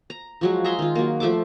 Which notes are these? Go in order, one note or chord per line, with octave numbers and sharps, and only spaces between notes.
A#5
F3 F#3 G#3
G#4 E5 A#5 C6
D#3 F4
F#3 A#3
F3 A3 E5 D6